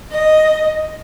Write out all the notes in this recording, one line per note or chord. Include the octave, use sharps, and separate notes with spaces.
D#5